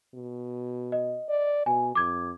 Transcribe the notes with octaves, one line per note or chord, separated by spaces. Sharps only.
B2
D#5
D5
B2 G#5
F2 D6 G#6